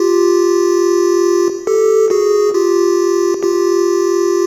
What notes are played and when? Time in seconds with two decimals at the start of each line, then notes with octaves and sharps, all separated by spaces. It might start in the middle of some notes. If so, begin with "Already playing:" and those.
Already playing: F4 G4
1.67 G4 A4
2.10 F#4 G#4
2.54 F4 G4
3.43 F4 G4